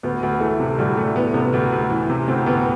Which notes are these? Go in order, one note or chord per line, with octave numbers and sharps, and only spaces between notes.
D2 B3
D2
E3 A3
C3
D2 G3
D2 A3
E3 B3
C3 B3
D2
D2
E3
C3
D2 C4
D2 B3